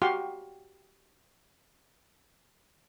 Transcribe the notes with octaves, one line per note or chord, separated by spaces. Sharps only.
F#4 G4 F5 C6